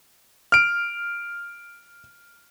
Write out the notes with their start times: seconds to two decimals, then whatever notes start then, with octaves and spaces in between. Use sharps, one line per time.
0.52 F6 D7